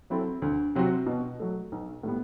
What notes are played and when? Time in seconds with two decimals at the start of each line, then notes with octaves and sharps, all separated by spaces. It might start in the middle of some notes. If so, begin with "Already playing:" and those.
0.10 F#3 C4 E4 A4
0.42 D2
0.75 C3 F#3 C4 F#4
1.06 B2
1.40 F#3 A3
1.72 B1
2.03 A2 G3 B3